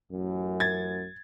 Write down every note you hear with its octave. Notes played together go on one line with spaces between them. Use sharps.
A1 F#2
G#6 A6